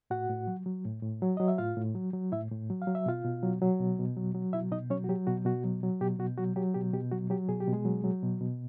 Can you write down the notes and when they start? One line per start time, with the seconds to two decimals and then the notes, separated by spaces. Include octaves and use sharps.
0.10 A2 F#4 F#5
0.29 A2
0.47 F#3
0.66 F#3
0.85 A2
1.03 A2
1.22 F#3
1.37 F#3 D#5
1.48 E5
1.58 A2 F4 F5
1.77 A2
1.95 F#3
2.13 F#3
2.32 A2 E4 E5
2.51 A2
2.70 F#3
2.82 F5
2.87 F#3
2.95 E5
3.06 B2 F4 F5
3.25 B2
3.43 F#3
3.62 F#3
3.80 B2
3.99 B2
4.17 F#3
4.35 F#3
4.53 B2 E4 E5
4.71 B2 D#4 D#5
4.90 F#3 C#4 C#5
5.04 F#4
5.09 F#3 G4
5.27 B2 F#4
5.45 B2 F#4
5.64 F#3
5.83 F#3
6.01 B2 G4
6.19 B2 F#4
6.38 F#3 F#4
6.56 F#3 G4
6.74 B2 G4
6.94 B2 G4
7.12 F#3 F#4
7.30 F#3 G4
7.49 B2 G#4
7.60 G4
7.68 B2
7.73 G#3 G#4
7.85 F#3
8.04 F#3
8.22 B2
8.41 B2